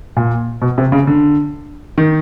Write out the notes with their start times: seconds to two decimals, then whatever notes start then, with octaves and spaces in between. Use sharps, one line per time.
0.17 A#2
0.62 B2
0.78 C3
0.92 C#3
1.07 D3
1.98 D#3